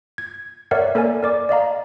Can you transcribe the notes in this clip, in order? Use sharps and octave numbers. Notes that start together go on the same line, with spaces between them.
G#6
A#4 C#5 D5 E5 F#5
A#3 A4 A#4 D5 G#5
A#4 D5 D6
D5 D#5 F5 A#5